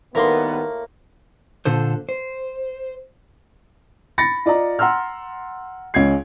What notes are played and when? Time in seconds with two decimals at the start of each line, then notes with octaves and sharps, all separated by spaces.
0.15 A2 D#3 G3 A#3 B3 A#4 C6
1.65 A#2 D3 A4 C5
2.09 C5
4.18 B5 A6 A#6 C#7
4.46 F4 D5 D#5 A#5
4.79 F#5 A#5 C6 E6 F6
5.94 C#2 G#3 C#4 G#6 C7